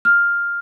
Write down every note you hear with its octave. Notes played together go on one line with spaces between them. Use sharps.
F6